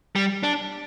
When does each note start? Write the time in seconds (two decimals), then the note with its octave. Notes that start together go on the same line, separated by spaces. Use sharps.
0.16 G3
0.43 D4